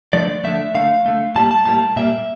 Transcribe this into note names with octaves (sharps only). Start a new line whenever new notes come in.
D3 F3 A3 D5
D3 F3 A3 E5
D3 A3 F5
D3 A3
A2 G3 A#3 A5
A5
A2 G3 A#3 A5
A#2 G3 A#3 E5